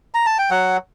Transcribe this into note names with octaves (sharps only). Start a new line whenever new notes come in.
A#5
A5
G5
F#3 F#5